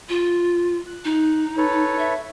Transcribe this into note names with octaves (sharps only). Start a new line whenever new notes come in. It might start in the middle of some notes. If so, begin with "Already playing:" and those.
F4
F#6
D#4
A4 B4 C#5
E5